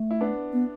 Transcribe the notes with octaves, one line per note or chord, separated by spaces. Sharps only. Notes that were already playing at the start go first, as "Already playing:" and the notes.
Already playing: A3
E4
B3 D4
B3